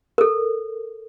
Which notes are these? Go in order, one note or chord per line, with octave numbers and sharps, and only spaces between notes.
A4 A#4